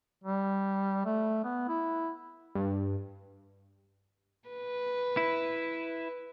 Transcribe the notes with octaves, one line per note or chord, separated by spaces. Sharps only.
G3
A3
B3
E4
G2
B4
E4